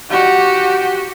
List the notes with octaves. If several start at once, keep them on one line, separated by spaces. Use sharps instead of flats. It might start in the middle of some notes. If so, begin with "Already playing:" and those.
F#4 G4